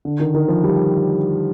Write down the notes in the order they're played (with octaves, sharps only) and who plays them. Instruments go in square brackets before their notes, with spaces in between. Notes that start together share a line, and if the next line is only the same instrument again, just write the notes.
[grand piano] D3
D#3
D#3
F3
G3